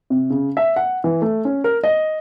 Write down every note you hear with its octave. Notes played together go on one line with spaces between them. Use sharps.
C3
C#3
E5
F#5
E3
A3
C#4
A#4
D#5